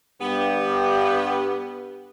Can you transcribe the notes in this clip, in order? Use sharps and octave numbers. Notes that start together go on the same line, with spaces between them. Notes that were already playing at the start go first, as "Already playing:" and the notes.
G2 B3 G4